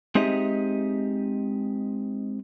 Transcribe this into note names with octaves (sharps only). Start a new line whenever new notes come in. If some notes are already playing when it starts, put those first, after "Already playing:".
G#3 C4 D#4 G4 D#5 E5